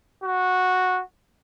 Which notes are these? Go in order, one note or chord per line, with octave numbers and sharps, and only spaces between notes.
F#4